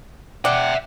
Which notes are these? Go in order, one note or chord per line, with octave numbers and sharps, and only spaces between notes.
D5 E5 F#5 G5